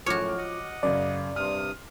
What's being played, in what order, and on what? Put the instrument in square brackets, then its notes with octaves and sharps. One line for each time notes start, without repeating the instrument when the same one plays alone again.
[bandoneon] F#2 A2 [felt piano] F3 D6 F6 [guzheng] F#4 C#5
[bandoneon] D#5 F#5
[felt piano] F#2 C#3 [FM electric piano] D5
[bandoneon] G2 C3 D#6 [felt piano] C6 F6